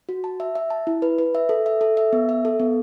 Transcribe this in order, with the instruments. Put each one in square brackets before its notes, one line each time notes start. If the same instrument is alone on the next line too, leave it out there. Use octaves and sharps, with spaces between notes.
[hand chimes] F#4
A5
E5
E5
A5
E4
B4
B4
E5
A4
E5
A4
E5
B3
E5
A4
B3